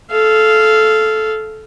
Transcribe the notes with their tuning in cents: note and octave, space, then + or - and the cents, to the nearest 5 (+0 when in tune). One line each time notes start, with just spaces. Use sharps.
A4 -15 F5 -15